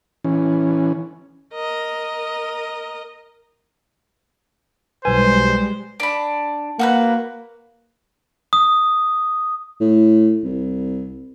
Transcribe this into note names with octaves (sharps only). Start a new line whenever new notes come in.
E3 C#4
A#4 D#5
B1 G3 G#3 B4 C5 G#5
D4 B5
A#3 F#4 A#4 B4
D#6
A2
C2